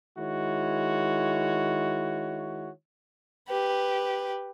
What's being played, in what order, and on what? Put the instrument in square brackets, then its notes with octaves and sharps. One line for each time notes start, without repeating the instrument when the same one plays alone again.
[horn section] D#3 G#3 E4 F#4 C#5
[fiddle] G4 B4